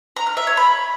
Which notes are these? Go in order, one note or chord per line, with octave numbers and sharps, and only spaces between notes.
A#5
F6
E5
C#5
B5